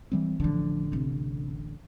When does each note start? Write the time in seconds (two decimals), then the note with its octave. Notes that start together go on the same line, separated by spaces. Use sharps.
0.12 E3 G3 C4
0.40 A1 D3 E3 F3
0.92 C3 C4